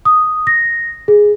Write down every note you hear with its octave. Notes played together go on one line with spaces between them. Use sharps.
D#6
A#6
G#4